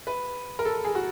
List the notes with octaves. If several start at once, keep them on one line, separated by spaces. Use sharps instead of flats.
B4
A#4
A4
G#4
F#4